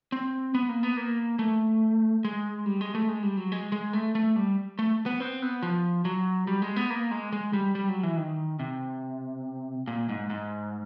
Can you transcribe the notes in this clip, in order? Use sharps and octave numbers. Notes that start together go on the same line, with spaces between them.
C4
B3
A#3
B3
A#3
A3
G#3
G3
G#3
A3
G#3
G3
F#3
G#3
G#3
A3
A3
G3
A3
B3
C4
B3
F3
F#3
G3
G#3
B3
A#3
G#3
G#3
G3
G3
F#3
E3
D#3
C3
A#2
G#2
G#2